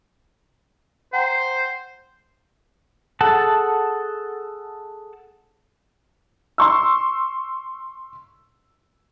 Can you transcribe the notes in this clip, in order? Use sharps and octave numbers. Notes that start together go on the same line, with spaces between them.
C5 F#5 G5 A#5
G#4 A4 F#5 A5
C6 C#6 E6